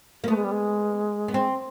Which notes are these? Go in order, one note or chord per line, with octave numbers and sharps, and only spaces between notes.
A#3
A3 B3
G#3
G3
G#3
B3
C4